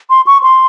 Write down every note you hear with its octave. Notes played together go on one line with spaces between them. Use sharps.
C6
C#6
C6